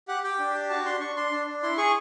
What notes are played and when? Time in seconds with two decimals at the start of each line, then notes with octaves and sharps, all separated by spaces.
0.08 G4 F#5
0.24 G4 G5
0.39 D4
0.54 G4
0.70 F#4 A5
0.86 D4 C6
1.00 D4 C#6
1.16 D4 C6
1.31 D4
1.47 D4
1.63 E4 C6
1.78 G#4 C#6